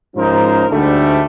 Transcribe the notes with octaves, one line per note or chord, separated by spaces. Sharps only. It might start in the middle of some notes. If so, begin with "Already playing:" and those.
G#2 F3 C#4 D#4 A#4 C5
D2 G#2 D3 G3 A3